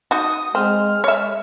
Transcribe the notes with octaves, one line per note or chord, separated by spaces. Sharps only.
D#4 F#4 D#6
G#3 C4 F6
G#3 C#5 E5